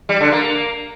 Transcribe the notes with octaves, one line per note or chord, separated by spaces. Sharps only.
G3
D3
A#3